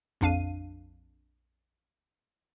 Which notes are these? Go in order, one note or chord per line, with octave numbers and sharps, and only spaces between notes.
A#1 F2 D4 F5 D#7